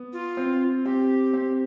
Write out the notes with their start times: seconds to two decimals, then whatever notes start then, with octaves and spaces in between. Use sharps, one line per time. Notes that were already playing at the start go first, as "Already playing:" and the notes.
Already playing: B3
0.13 F4
0.37 C4
0.85 C4 G4
1.34 C4